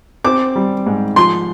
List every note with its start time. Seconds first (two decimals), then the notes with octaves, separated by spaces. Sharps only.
0.25 C4 D6
0.56 G3
0.86 G#2
1.16 F3 C6